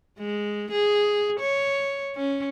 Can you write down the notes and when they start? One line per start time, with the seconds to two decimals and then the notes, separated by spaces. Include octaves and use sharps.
0.19 G#3
0.71 G#4
1.40 C#5
2.16 C#4